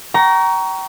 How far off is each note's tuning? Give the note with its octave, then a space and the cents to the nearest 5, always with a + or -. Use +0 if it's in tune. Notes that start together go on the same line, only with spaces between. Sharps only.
G5 -35 A#5 +10 C#6 +20